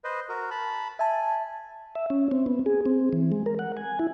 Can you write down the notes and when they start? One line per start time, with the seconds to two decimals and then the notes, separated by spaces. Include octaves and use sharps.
0.04 B4 C5 D#5
0.29 F#4 A#4
0.51 A5 B5
0.99 E5 G#5 A5
1.95 E5
2.10 C#4
2.31 C4
2.46 B3
2.66 G#4
2.86 C4
3.13 E3
3.32 G#3
3.46 A#4
3.59 F#5
3.77 G#5
3.99 E4